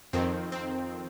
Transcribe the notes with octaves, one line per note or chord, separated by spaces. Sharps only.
F2 D#3 C4
C4